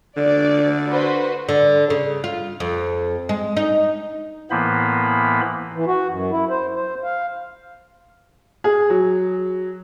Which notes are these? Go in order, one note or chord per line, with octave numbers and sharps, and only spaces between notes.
D3 D5
F#4 B4 C5
D3
C#3
F4
F2
G#3
D#4
A2 E3 A#3 B3 C5 B5
E3
F#4
F#2
E4
C5
C5
F5
G#4
F#3